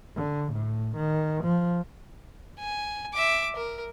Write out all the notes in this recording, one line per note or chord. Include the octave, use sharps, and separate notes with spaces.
D3
A2
D#3
F3
G#5
E5 D6
A#4